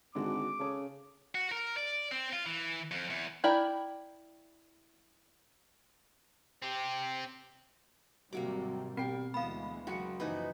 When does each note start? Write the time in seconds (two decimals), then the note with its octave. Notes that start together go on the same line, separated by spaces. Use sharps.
0.15 G#1 D3 G#3 F#4 D6
0.59 C#3 A4 C#5 D#6
1.35 F#4
1.52 A#4
1.77 D5
2.11 C4
2.33 F4
2.46 E3
2.91 F2
3.10 E2
3.44 E4 A#4 D5 G5 B5
6.62 C4 G4
8.33 G#1 C3 F#3 G3 A#3 F#4 D6
8.97 B2 G3 C4 G5 C7
9.34 D2 E3 G#3 B3 F5 B5
9.87 F#1 F#4 F#5 C#7
10.20 F#1 E3 F3 D#4 B4